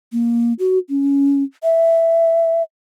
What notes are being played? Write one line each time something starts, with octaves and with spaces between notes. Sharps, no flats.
A#3
F#4
C#4
E5